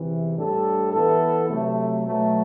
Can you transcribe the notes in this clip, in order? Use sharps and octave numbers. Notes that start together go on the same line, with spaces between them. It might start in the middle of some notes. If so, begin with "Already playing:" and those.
Already playing: E2 C3 E3
A2 G3 D4 A4
E3 B3 E4 A4
C3 F#3 A3
B2 F#3 A3